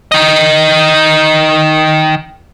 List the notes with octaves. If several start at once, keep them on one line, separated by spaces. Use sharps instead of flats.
D#3 D#5